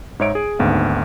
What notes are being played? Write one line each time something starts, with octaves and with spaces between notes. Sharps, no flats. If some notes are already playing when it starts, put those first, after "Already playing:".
G#2 G#3 D#4 C#5 E5 D7
G#4
G#1 D2 G#2 B3 F5